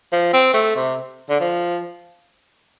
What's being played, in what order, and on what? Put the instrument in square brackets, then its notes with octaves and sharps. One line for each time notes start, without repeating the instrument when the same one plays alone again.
[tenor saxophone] F3
C4
A3
C3
D3
F3